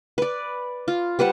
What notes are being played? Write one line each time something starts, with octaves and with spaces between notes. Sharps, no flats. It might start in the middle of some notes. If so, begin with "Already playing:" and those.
B4 D5
F4
G3 B4 C5 F#5